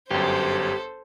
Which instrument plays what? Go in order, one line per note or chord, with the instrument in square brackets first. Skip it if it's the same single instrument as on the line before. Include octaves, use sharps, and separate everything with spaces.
[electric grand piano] G1 F#2 [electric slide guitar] G4 [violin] A4 C5